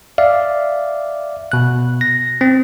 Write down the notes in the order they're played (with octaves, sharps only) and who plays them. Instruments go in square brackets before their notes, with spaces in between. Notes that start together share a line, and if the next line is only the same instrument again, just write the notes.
[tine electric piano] D5 E5 F5
B2 F#6
A#6
C4